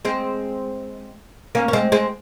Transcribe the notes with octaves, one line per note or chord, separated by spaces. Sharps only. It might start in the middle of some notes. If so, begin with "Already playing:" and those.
G#3 C4
A#3 C#4
C#4
G#3 C4
G#3 C4